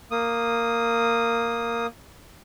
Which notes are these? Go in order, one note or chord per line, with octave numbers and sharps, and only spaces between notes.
A#3 D#6